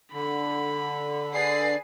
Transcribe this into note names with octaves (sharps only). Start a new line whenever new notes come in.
D3 B5
G#4 B4 D5 C7